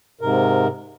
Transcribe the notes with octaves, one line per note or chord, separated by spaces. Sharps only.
G#2 C3 A#4